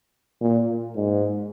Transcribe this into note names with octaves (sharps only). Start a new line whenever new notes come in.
A#2
G#2